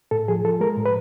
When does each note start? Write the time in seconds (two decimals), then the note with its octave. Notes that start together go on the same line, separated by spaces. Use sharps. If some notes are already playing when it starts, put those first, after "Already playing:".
0.11 A2 A4
0.28 F3 G#4
0.45 F3 A4
0.61 G#3 A#4
0.77 A2
0.86 B4